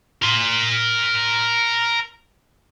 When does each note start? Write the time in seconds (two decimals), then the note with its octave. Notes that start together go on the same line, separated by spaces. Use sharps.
0.22 A#4 C6